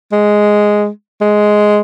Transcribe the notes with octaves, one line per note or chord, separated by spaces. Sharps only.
G#3
G#3